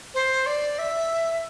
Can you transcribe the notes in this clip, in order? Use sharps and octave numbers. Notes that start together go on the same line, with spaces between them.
C5
D5
E5